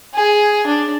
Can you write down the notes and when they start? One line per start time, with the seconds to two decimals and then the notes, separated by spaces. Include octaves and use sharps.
0.14 G#4
0.67 D4